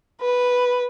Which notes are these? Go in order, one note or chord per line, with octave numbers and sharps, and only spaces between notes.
B4